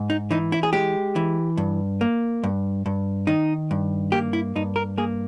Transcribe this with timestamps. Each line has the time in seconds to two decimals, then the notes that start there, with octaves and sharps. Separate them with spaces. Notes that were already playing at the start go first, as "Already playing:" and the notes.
Already playing: G#2
0.10 D#4
0.31 E3 D#4
0.52 E4
0.63 G#4
0.73 G#3 G4
1.16 E3
1.57 G2
2.01 A#3
2.44 G2
2.86 G2
3.27 D#3 D#4
3.71 G2
4.12 A#3 G4
4.33 E4
4.56 G2 D#4
4.76 A#4
4.98 A#3 G#4